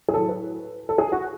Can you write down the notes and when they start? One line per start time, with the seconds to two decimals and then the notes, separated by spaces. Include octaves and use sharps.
0.08 G#4
0.14 A2 F#3 A4
0.28 B4
0.89 A4
0.98 G#4
1.12 F#4